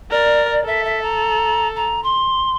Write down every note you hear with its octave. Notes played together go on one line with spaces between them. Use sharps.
A#4 D5
A4 E5
E5
A#5
A#5
C6